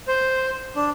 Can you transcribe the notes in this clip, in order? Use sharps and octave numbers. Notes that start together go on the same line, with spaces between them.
C5
D4